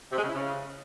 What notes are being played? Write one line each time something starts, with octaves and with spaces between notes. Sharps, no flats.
C3
G#3
C#3
E4
C#3